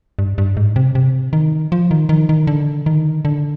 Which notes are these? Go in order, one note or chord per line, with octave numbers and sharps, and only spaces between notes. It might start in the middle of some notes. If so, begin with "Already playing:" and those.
G2
G2
G#2
C3
C3
D#3
F3
D#3
D#3
D#3
D3
D#3
D3